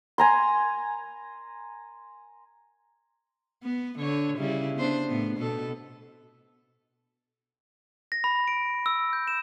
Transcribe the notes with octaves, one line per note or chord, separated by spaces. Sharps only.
G#5 A#5 C6
B3
D3 C#5
C#3 G3 E4
B3 D4 C5
A2 B3
B2 B3 A4
A#6
B5
D7
E6
G6
E7